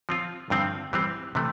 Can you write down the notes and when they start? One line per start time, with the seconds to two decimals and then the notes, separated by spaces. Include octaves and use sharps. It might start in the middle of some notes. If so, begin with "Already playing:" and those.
0.09 F3 C4 F4
0.50 G2 D3 F3 C4
0.93 E3 G3 C4
1.35 C3 E3 A3